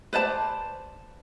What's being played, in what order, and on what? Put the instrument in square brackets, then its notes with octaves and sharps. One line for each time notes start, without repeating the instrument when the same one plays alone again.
[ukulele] B4 C5 D5 A5